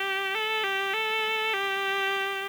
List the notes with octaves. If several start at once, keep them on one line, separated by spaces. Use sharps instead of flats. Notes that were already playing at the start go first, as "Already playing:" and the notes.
Already playing: G4
A4
G4
A4
G4